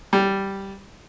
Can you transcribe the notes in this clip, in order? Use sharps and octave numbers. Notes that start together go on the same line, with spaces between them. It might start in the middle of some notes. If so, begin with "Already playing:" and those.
G3